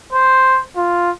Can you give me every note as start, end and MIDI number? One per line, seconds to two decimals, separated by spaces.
0.13 0.61 72
0.76 1.11 65